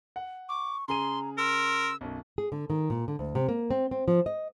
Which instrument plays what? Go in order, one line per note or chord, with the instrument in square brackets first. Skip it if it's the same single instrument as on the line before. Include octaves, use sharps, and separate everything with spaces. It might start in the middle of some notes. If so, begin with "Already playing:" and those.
[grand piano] F#5
[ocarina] C#6 [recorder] D6
[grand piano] C#3 G#4 D#7 [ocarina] A#5 [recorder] C6
[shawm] A#4 [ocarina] C6 [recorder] E6
[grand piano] B1 F#2
[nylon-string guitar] G#4
D3
D#3
A#2
D3
D2
C3
A#3
C4
C4
F3
D#5